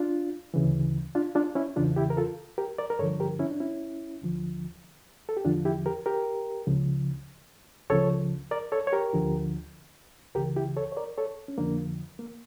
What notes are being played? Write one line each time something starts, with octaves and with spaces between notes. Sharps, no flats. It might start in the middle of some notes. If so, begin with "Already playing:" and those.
Already playing: D4 F4
D2 C#3 E3
D4 F4
D4 F4
C#4 E4
E2 C#3 E3 D4 F4
E4 G4
A#4
F4 A4
G4 A#4
A#4 D5
A#4
G2 D3 F3 A4 C#5
G4 A#4
C#4 E4
D4
C#4 E4
D2 D3 F3
A4
G4
E2 D3 F3 D4 F4
E4 G4
G4 A#4
G4 A#4
C#2 C#3 F3
C#2 C#3 F3 A4 C#5
A#4 D5
A4 C#5
C#5
G4 A#4
D2 D3 F3
C#2 C#3 E3 G4 A#4
E4 G4
A4 C#5
C#5
A#4 D5
A4 C#5
C#4
F2 D3 F3 A#3 D4
A#3